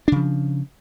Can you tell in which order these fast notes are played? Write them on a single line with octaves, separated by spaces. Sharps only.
D4 C#3 F3